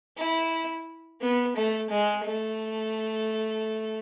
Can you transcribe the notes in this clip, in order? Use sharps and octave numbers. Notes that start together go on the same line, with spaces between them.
E4
B3
A3
G#3
A3